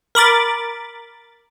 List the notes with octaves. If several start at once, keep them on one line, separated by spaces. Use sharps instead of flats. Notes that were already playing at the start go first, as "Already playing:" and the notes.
A#4 B5 D6 A6